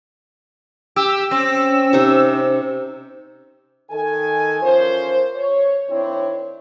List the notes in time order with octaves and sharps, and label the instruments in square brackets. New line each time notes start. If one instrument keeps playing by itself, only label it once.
[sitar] G4 [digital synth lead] E6
[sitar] C4 [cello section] C#4
[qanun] C3 D#4
[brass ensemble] D#3 A4 G#5
E3 F3 C#4 F4 A#4 C5
C#5
D#3 C4 D4 E4 C#5